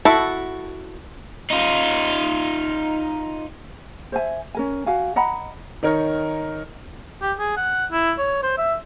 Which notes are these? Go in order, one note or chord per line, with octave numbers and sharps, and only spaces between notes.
E4 F#4 A4 A5
D#4 F4
C5 E5 G#5
C#4 A#4 G#5
F#4 F5 G#5
D#5 F#5 A#5 B5
D#3 D#4 A#4 C#5
G4
G#4
F#5
E4
C#5
C5
E5